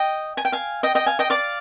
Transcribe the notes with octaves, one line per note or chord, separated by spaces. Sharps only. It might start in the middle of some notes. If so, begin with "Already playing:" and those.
Already playing: D#5 G5
G#5
G5
F5 G#5
D#5 G5
D#5 G5
F5 G#5
D#5 G5
D5 F5